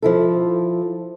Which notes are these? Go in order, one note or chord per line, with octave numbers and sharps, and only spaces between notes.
F3 E4 A4